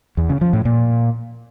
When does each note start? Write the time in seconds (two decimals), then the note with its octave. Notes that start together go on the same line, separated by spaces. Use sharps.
0.17 E2
0.29 C#3
0.41 F3
0.53 A2
0.65 A#2